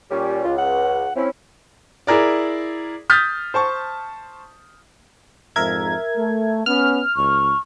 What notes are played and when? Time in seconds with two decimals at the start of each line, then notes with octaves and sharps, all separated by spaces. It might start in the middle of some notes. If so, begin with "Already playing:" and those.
0.11 A#2 G3 C#4 G4
0.44 C#2 F4
0.58 F#5
1.16 C4 C#4 E4
2.07 E4 G#4 A#4 D5
3.10 D#6 F6 G6 A6 B6
3.54 C5 A5 C#6
5.56 F2 G#2 A#4 E5 G#6
6.15 A3
6.66 B3 C#4 F6
7.16 C#2 C#6